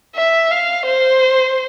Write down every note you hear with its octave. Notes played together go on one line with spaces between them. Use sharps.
E5
F5
C5